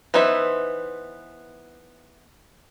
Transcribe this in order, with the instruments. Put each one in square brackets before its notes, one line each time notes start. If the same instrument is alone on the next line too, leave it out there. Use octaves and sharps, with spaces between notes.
[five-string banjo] E3 B3 D#4 C5 E5